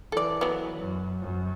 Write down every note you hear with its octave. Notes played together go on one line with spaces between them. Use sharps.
E3 A4 D5
F#3 B3
F#2
F#2